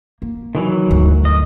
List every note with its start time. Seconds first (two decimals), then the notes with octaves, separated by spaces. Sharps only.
0.22 A#3
0.55 D#3 E3 F#3
0.90 D2 G2
1.25 D#5